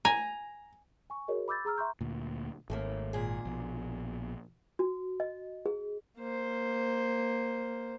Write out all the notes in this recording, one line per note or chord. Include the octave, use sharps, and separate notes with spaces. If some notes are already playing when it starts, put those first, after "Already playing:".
G#5 A#5
G#5 C#6
F#4 G#4 A#4 C#5 D#5
B5 D6 E6 G6 A6
G#4 A#5 E6 F6
E5 A#5 C6 C#6 G6
D2 A#2
G#1 D#2 A3 A#3
A#2 G#4
A#1 B2
F#4
D#5
G#4
A#3 C5